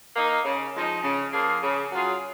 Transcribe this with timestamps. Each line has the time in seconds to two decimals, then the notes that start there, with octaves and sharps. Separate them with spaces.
0.16 A#3 D#4
0.45 C#3
0.75 F3 G#3 D#4
1.03 C#3
1.32 F3 A#3 F4 G#4
1.63 C#3
1.91 F#3 C#4 F4 G#4